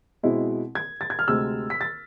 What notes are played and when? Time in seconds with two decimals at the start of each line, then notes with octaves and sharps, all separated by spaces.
0.23 B2 G#3 C4 E4
0.75 G#6
1.01 A6
1.10 G#6
1.19 F6
1.28 D2 C3 G#3 C4 E6
1.70 B6
1.81 A6